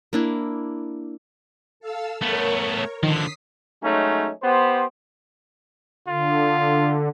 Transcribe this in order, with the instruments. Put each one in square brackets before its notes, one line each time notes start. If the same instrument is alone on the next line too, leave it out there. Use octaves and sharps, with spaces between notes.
[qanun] A#3 D4 E4
[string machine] A4 F5 E6
[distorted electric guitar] A3 B3 [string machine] A#4 C#5
[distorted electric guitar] D3 F3 [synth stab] D#3 [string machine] D#6 B6 C7
[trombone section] F#3 G#3 A3 C#4 D#4
B3 G4 C5
[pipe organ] D3 [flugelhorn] F4